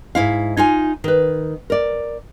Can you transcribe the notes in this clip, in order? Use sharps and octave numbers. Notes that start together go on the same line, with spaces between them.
G#2 E4 F5
D#4 F4 G#5
D#3 B4
A#4 D5